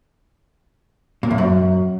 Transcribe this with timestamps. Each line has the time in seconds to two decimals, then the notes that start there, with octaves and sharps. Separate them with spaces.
1.23 A#2
1.31 E2
1.38 F#2